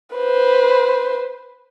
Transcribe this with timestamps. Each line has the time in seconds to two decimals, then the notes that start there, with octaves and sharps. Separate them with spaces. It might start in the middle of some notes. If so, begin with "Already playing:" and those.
0.16 B4 C5